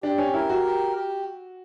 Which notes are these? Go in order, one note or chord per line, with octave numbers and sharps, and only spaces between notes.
D4 G4
C#4
E4 A#4
F#4
G4
G4